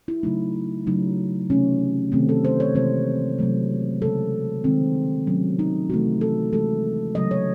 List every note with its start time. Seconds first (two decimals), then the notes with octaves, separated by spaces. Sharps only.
0.08 E4
0.23 C#3 F#3 A3 D#4
0.87 C#3 F#3 A3 D#4
1.50 C3 E3 A3 C#4
2.12 C3 D#3 A3 C4
2.29 A4
2.45 C5
2.60 C#5
2.75 C3 E3 G#3 C5
3.39 C3 F#3 A3
4.02 C#3 G#3 A4
4.64 D#3 G#3 C4
5.27 C3 F#3 A3 C#4
5.59 D#4
5.90 C3 E3 A3 F#4
6.21 A4
6.53 C3 E3 G#3 A4
7.15 C#3 F#3 A3 D#5
7.31 C#5